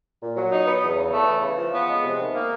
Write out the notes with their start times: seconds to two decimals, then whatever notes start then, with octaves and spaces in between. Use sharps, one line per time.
0.21 A#2
0.36 F#3
0.51 D#4
0.67 B3
0.82 E2
0.96 C#3
1.13 A3
1.27 E3
1.42 C#3
1.57 F3
1.73 B3
1.89 G#3
2.03 C3
2.18 D#3
2.34 A#3